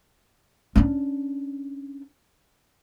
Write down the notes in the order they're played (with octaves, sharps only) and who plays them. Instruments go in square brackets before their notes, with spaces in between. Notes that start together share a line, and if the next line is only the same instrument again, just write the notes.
[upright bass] C#4 D4